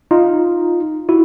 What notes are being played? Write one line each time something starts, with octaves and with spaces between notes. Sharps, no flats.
D#4 F4
E4 F#4